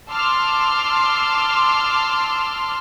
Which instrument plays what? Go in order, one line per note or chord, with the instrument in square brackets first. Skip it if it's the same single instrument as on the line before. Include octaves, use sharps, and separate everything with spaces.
[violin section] A5 C6 D6 E6 F6